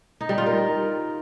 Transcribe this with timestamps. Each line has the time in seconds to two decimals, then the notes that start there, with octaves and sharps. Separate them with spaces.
0.21 D#4
0.29 G3
0.38 F4
0.46 A#4